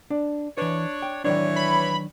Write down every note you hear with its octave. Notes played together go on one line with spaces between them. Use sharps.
D4
E3 D4 B4 C#5
G5
D#3 E3 F#3 D4 C#5
B5